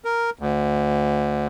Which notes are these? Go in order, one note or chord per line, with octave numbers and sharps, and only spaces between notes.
A#4
D2